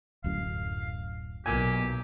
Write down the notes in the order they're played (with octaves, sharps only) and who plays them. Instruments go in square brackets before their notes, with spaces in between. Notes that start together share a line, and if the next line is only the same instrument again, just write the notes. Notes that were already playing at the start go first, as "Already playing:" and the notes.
[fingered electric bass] D1 F#2 A2 [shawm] F5
[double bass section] B1 [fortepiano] A#2 G#5 [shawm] G4